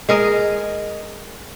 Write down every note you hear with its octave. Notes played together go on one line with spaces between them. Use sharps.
G#3 A#4 D#5